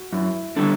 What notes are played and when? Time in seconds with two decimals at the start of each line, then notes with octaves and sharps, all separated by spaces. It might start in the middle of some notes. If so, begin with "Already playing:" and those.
Already playing: F#4
0.13 F#2 E4
0.56 D3 G3 D4 A4